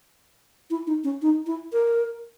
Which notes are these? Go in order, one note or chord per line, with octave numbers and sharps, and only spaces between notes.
E4
D#4
C#4
D#4
E4
A#4